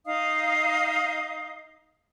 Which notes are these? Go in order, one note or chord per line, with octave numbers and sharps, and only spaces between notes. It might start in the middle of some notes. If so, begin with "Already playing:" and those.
D#4 D#5 F5 D#6